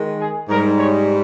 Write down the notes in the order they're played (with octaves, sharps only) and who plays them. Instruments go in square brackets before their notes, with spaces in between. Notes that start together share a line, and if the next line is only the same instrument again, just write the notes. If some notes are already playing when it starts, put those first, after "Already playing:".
Already playing: [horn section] D#3 G#3
G#4
G#2 G3 A#4
C#5